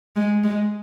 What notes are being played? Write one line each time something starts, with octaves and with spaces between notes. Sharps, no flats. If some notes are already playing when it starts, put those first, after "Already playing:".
G#3
G#3